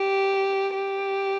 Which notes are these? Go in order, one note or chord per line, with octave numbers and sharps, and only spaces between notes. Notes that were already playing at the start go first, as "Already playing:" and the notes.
Already playing: G4
G4